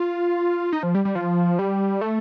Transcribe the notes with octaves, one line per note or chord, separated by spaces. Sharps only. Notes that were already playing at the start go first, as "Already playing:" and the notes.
Already playing: F4
D#4
F3
G3
G3
F3
G3
A3